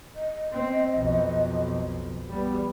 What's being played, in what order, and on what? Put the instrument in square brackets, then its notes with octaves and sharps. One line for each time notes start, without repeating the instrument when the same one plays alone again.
[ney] D#5
[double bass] C4
B1 F2
G3 B3